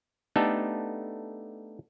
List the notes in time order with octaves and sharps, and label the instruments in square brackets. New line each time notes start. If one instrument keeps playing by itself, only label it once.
[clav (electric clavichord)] A3 B3 D4 D#4 G4 A4